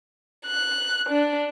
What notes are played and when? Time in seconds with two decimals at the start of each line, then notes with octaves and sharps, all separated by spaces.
0.47 F#6
1.09 D4